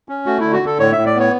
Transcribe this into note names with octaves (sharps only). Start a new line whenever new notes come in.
C#4
A3 F#4
D3 E4
F#4
D3 A4
A2 C#5
A2 E5
D5
B3 C#5